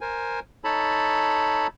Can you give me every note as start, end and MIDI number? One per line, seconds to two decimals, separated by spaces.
0.01 0.40 70
0.01 0.40 72
0.01 0.40 80
0.64 1.67 63
0.64 1.67 69
0.64 1.67 73
0.64 1.67 81
0.64 1.67 83